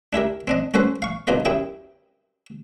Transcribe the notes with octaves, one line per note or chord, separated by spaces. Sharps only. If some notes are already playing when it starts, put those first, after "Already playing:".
D4 E4 G4 A#4
C4 D4 D#5
C#4 F#4 A4 B4 C5
F5 C#6
C2 B2 D#4 F4 A#4 D5
F#2 E4 G4 G5 D#6